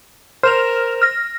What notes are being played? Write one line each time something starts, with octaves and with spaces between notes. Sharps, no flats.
A#4 C5 F6 E7 F7
F6 A#6